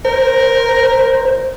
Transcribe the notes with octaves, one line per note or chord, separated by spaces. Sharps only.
A#4 C5